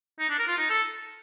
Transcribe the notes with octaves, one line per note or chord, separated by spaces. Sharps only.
D#4
D4
A#4
F4
D#4
A4